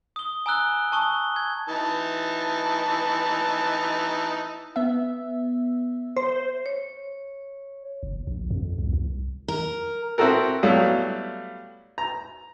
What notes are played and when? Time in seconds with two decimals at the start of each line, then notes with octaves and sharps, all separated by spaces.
0.16 D#6 G7
0.46 G#5 A#5 D#6 E6 F#6 G7
0.92 A5 C#6 D#6 G7
1.36 G#6
1.69 E3 D#4 A5
4.76 B3 E5
6.17 C5
6.66 C#5
8.03 F#1
8.27 A#1
8.50 F2
8.78 C2
8.93 C2
9.48 A#4
10.18 C4 E4 F#4 A4 A#4
10.63 F#3 G3 A3 B3 E4 F5
11.98 A#5